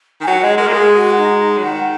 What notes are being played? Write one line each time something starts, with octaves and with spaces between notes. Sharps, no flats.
D#3
G#5
F#3 F#5
G#3 D#5
G#3 A#4
A#3
G#3 G#4
F#4
D#4
F#3
D#3 F#5